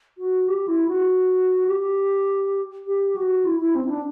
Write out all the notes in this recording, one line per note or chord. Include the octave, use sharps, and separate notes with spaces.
F#4
G4
E4
F#4
G4
G4
F#4
E4
E4
C4
E4
D4